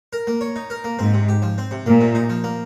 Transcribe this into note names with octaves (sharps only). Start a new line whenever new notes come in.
A#4
A#3
C#5
D#4
A#4
A#3
G#2 C4
C3
G4
F3
C4
C3
A#2 A#3
C3
D#4
F3
A#3